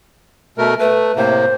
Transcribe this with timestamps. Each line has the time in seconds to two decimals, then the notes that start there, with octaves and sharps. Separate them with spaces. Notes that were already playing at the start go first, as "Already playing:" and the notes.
0.58 B2 A3 A#4
0.80 A3 B4
1.17 A2 C3 A#3 C5